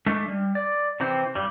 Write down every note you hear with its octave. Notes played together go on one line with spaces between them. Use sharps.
G#3 A3 D4 A4
G3
D5
C3 E3 C4
G2 G3